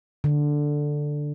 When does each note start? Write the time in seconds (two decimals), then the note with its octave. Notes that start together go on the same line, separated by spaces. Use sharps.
0.24 D3